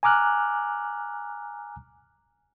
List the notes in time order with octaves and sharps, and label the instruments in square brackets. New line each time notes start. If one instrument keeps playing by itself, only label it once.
[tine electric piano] G#5 A#5 D6 F6 F#6